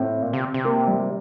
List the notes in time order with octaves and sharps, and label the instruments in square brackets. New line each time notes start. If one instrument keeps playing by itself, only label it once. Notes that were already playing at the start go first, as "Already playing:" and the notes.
Already playing: [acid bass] A2 [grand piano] C4
[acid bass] A#2
C3
C3
[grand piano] A#3
G3